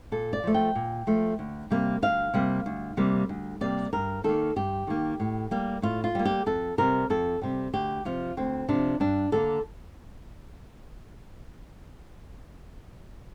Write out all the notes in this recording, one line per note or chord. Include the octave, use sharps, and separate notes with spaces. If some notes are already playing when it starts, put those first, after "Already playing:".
A#2 A4
D5
F3 A3
G5
A#2
F3 A3
D2
C3 G3 A#3
D2 F5
C3 G3 A#3
D2
C3 G3 A#3
D2
C3 G3 A#3 D5
G2 A#4
D#3 A#3 A4
G2 G4
D#3 A#3
A2
G3 A#3
A2 F4
F4
G3 A#3
G4
F2 A4
C3 G3 A#4
F2 A4
C3 G3
D2 G4
C3 F3 F4
D2 C4
C3 F3 D4
G2 D4
D3 G3 A#3 A4